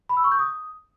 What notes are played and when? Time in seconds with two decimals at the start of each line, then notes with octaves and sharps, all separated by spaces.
0.09 B5
0.17 E6
0.24 C#6
0.32 G6
0.39 D#6